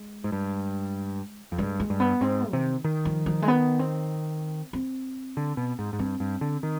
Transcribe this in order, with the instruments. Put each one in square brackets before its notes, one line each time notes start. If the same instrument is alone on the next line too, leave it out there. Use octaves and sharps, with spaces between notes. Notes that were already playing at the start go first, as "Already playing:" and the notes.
Already playing: [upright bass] G#3
[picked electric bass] G#2
G2
F2
[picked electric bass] G2 [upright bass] G#3
[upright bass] G#3
[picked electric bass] G2
[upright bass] B3
[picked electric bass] G#2 [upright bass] C4
[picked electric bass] C3 [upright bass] D#3
[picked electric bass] D#3
[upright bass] F3
F3
G#3
B3
C4
C4
[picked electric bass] D3
B2
G#2
G#2
[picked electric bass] G2 [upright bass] C4
[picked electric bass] G2
D3
D#3